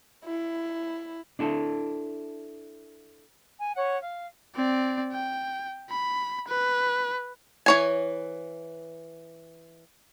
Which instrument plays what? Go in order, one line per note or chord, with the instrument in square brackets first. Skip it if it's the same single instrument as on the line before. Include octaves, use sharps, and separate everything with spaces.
[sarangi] E4
[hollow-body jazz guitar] D4 E4 A4
[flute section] G#5
C#5 F#5
F5
[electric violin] C4 D5
G5
B5
B4
[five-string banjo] E3 C#5 G#5